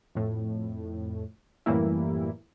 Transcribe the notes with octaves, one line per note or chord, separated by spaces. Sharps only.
F2 A2
F#2 A2 E3 G3 A#3 E4